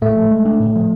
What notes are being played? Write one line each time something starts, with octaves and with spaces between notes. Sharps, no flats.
A2 A3
F3
G#3
D4
A2
F3